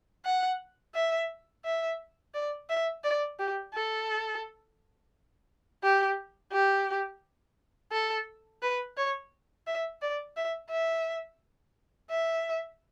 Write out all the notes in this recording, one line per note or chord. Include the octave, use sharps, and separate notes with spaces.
F#5
E5
E5
D5
E5
D5
G4
A4
G4
G4
A4
B4
C#5
E5
D5
E5
E5
E5